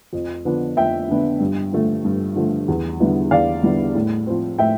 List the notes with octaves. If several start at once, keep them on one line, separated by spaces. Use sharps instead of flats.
F2
D3 F3 B3 D4
F2 E5 G5
D3 F3 B3 D4
G2
D3 F3 A3
G2
D3 F3 A3
E2
D3 G3 B3 E4
E2 D5 F5
D3 G3 B3 E4
A2
F3 C4
A2 E5 G5